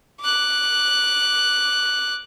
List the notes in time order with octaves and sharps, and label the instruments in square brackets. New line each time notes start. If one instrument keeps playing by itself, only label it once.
[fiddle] D6 F#6